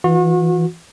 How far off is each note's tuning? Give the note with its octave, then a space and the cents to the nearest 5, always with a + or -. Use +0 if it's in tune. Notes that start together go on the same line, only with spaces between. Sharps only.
E3 +0 F#4 -40